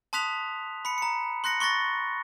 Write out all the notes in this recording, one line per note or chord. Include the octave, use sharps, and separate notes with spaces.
A5 C6 D#6 F#6 B6 F7
B5 C#7
A#5 C#7
C6 F#6 A#6 C#7
C6 C#6 F#6 A6 A#6